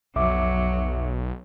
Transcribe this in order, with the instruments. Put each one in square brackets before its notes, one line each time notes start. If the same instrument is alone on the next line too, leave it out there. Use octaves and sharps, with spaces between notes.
[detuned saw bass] B1 [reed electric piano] F2 E5 D6 [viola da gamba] F#3